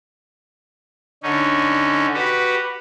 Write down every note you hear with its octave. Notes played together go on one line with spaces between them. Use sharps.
D3 C#4 D#4
F#4 G4 B4